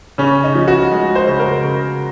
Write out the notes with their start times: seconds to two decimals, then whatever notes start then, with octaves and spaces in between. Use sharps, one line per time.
0.18 C#3 C#4
0.43 D#4
0.55 F3
0.68 F#4
0.92 G#3
1.15 C5
1.28 C#3
1.40 A#4
1.64 C#3